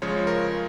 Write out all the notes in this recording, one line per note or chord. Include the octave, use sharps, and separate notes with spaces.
C#3 F3 G#3 C#5
A#4